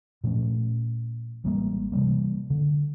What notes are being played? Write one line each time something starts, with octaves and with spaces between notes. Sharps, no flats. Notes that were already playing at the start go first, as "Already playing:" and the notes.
A#2 F3 A3 C#4
A1 G3 G#3 A#3
C3 E3 G3 A#3
D3